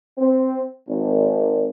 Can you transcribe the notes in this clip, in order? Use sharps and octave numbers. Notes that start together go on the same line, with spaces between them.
C4
G#1